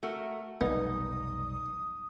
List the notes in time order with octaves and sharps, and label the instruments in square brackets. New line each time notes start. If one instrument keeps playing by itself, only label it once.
[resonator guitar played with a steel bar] A3 F#4 A#4
[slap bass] F1 B1 G3 [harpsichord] B3 [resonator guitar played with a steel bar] D#4 [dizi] D#6